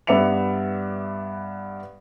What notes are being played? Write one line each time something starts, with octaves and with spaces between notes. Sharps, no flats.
G2 B3 D5 E5 C#7 F7